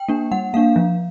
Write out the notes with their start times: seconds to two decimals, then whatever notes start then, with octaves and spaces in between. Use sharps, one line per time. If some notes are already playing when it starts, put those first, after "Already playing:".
Already playing: G5
0.08 A#3 D4
0.32 G3 F#5
0.54 A#3 D4 F5
0.76 F3